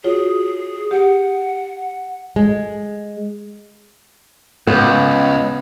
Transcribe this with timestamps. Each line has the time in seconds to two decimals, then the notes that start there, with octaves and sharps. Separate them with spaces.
0.04 F4 F#4 G#4 C#5
0.91 G4 F#5
2.36 G#3
4.67 C#2 B3